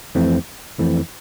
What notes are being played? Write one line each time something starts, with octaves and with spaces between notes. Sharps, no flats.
F2 E3 A3 C4
F2 E3 A3 C4